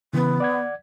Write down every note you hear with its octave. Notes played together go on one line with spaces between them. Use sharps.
C#3 E3 B3
D5 F#5 G#6